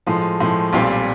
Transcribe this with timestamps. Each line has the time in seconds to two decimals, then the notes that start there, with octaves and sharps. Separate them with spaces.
0.07 A2 F3 G#3
0.40 A2 F3 G#3
0.73 B1 A#2 G3 C4 F4